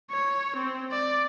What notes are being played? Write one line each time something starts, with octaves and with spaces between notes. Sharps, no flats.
C#5
C4
D5